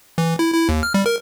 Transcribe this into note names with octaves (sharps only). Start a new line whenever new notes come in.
E3
E4
E4
D#2
F6
G3
A#4